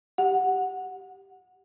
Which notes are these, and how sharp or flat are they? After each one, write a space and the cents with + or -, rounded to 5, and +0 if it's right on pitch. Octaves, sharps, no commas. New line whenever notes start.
G4 +0 F#5 +0